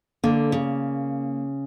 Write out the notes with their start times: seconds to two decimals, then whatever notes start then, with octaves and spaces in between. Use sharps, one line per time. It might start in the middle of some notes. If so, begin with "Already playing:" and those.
0.24 D3 A#3
0.52 C#3